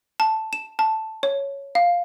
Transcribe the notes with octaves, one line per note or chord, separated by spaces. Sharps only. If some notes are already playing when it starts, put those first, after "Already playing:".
A5
E7
A5
C#5
F5